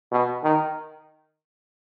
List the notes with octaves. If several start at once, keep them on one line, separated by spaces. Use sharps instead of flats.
B2
D#3